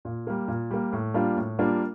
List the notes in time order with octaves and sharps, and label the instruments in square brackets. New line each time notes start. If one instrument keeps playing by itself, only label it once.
[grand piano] A#2
G3 A#3
A#2
G3 A#3
A2
G3 A#3 D4 F4
A2
G3 A#3 D4 F4